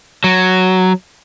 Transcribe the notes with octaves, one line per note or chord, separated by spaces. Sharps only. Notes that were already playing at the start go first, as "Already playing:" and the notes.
F#3